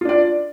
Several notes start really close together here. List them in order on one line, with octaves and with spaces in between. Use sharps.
F4 D4 D5